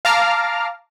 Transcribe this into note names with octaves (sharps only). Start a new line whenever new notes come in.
F5 A5 A#5 D6 F6